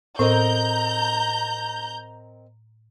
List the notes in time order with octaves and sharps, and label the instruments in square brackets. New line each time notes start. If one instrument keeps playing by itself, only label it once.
[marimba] A2 [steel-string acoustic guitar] C4 A#4 D#5 [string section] A#5 G6